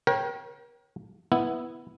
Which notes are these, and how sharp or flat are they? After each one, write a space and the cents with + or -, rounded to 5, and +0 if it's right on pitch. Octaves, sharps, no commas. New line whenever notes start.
A#4 +40 C#5 -30 G5 -10
B3 +0 E4 +0